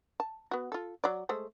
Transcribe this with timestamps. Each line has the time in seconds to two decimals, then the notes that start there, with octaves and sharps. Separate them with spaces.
0.20 A5
0.51 B3 F#4
0.72 F4 A4
1.04 F#3 D5
1.29 G#3 A3 C5